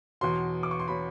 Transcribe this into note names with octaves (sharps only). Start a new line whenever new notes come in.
E2 B2 F#3 C6
D6
C#6
C6
B2 F#3 B5